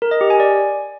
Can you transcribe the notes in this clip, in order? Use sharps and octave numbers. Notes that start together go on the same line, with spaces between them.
A#4
D#5
G4
G#5
D5